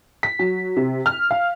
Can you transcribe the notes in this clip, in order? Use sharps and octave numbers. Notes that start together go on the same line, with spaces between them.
B6
F#3
C3
F6
F5